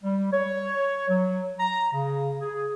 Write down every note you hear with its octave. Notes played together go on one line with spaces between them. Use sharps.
G3
C#5
F#3
A#5
C#3
G#4